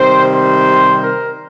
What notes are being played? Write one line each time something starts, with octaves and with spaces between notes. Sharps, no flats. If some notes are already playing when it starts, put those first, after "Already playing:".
Already playing: C3 D#3 G3 C5
C5
A#4